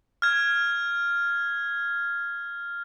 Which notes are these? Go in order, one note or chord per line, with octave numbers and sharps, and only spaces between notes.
F6 G#6